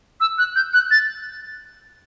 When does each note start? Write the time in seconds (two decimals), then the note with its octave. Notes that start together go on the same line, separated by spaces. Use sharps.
0.21 E6
0.38 F#6
0.56 G6
0.73 F#6
0.91 A6